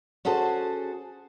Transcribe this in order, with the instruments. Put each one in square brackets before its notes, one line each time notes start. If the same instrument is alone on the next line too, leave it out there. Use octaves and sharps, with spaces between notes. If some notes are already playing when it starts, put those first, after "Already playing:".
[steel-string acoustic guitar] C#4 F#4 G#4 A4 C5